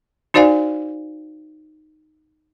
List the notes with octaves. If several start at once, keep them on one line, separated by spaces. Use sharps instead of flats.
D#4 F#4 C5 D5 F5 G#5